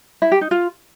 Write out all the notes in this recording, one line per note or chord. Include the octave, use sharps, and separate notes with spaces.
E4
G4
D#4
F4